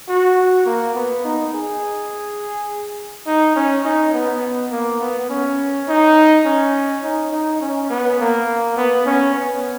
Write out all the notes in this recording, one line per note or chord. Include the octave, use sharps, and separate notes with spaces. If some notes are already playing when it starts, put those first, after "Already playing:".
F#4
A#3
B3
D#4
G#4
D#4
C#4
D#4
B3
A#3
B3
C#4
D#4
C#4
D#4
D#4
C#4
B3
A#3
B3
C#4
B3